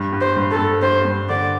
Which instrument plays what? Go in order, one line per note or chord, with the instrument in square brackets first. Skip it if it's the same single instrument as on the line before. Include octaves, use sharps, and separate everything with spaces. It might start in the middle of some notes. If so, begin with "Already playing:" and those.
Already playing: [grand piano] G2
G2
[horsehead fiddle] C5
[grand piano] G2
[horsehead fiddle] A4
[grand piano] G2
[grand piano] G2 [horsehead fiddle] C5
[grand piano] G2
[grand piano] D3 [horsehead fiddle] D5